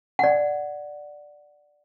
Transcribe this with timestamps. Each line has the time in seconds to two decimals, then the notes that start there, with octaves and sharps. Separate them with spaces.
0.19 D5 F#5